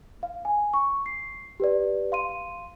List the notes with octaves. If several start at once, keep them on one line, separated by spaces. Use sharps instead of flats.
F5
G#5
C#6
C7
G4 B4 D5
F5 C6 D#7